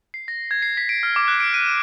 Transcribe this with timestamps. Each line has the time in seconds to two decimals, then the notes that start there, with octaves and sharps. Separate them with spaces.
0.14 C7
0.28 A#6
0.51 G#6
0.62 C7
0.77 B6
0.89 D7
1.03 F6
1.16 D6
1.28 F#6
1.40 D7
1.54 D#7
1.66 E7